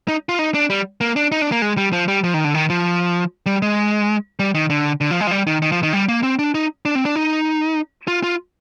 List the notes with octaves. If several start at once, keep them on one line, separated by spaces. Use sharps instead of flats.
D#4
F4
D#4
D4
G3
A#3
D4
D#4
D4
A#3
G#3
G3
F3
G3
F3
D#3
D3
D#3
F3
G3
G#3
G3
D#3
D3
D3
F3
G#3
F3
G3
D#3
D#3
F3
D#3
G3
A#3
C4
D4
D#4
D4
C4
D4
D#4
F4
F4